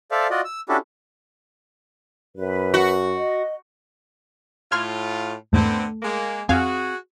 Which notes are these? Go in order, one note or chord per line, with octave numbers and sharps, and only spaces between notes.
A4 C5 D5 E5 F5
F4 F#4 D5 D#5
E6
C#4 D4 E4 F#4 G4 A4
F#2 B4
F#4
D#5
A2 F4 C6 F6 G#6
E2 G#2 D3 A3 B3 C4
G#3 A#3
F2 C4 F#4 G#4 F5 G#5